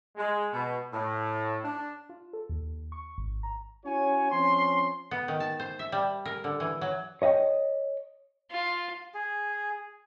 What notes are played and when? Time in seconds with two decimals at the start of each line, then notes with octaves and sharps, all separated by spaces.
0.16 G#3
0.52 B2
0.92 A2
1.63 D4
2.09 F4
2.33 A4
2.49 D#2
2.92 C#6
3.18 G#1
3.43 A#5
3.85 C#4 E4 F#4 C#5 G#5
4.31 F3 C4 C#4 C6
5.11 B3
5.28 D#3
5.40 A5
5.60 C5
5.79 E5
5.92 G3
6.25 A#4
6.44 D3
6.60 E3
6.81 F#3
7.22 C#5 D#5 F5 G5
8.51 F4
9.14 G#4